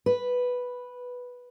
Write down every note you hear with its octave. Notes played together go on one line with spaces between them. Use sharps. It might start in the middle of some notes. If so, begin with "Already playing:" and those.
B4